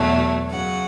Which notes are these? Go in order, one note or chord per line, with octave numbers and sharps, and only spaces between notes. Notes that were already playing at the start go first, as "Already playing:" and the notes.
Already playing: E2 B2 F#3 A3
F#2 C#3 F#3 F#5